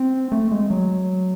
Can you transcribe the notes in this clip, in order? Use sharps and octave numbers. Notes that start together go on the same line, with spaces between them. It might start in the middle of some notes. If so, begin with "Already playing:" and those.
Already playing: C4
A3
G#3
F#3